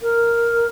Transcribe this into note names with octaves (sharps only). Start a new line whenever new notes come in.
A#4